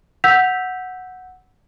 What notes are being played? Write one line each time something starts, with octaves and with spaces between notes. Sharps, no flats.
F#5 E6 G6 B6 F7